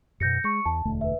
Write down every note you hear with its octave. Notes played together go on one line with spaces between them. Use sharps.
F#2 B2 G6 A#6 C#7
G#3 C#6 C#7
E2 A5
E1 D2 A3
B4 E5